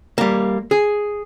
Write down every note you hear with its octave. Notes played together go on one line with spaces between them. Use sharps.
G3 A#3
G#4